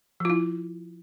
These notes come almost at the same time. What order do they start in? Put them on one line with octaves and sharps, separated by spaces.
F3 F4 E4